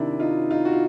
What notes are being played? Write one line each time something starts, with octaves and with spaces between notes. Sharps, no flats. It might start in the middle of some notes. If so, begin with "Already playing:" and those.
Already playing: C3 D#3 D4 E4
D#4 F4
D#4 F4
F#4
F4